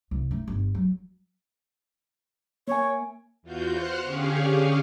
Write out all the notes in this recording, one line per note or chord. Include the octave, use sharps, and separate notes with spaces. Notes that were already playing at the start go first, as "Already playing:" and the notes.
C2
A3 D#4
G1
F#3
A#3 C#5 G#5
E2 F4 F#4 G6
C5 F#5 C6 F6 F#6
D3 C#4 G4 G#4 C#5 F5